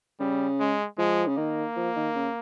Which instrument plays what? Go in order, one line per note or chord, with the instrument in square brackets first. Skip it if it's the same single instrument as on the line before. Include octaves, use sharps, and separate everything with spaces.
[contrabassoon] C#3 [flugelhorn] G3
[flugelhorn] G#3
[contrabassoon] F3 [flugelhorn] G#3
[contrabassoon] C#3
[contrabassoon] D#3 [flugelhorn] A#3
[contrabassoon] F3
D#3
C#3